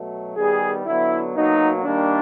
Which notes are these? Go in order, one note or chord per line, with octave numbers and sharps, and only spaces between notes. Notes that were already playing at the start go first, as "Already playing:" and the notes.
Already playing: B2 F#3 A3
D#3 G3 B3 G#4
D3 F#3 B3 E4
B2 F#3 A#3 D#4
D#3 G3 A#3 D4